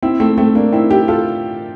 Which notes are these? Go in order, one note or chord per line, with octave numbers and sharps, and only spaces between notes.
C4 E4
A3 C4
A3 C4
A#3 D4
C4 E4
E4 G4
F4 A4